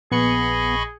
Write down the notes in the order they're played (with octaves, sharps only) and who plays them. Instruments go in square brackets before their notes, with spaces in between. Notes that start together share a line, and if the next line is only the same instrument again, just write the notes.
[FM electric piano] A#1 C#7 [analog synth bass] B3 [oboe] G#4 [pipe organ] D#5 B5 C#6